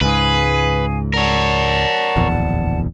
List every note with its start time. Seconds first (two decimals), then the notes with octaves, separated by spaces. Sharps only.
0.01 C#2 G#2 G#4 B4 F5 G#5
1.14 A#4 C#5 D5 F#5 A5
2.16 D1 A#1 E2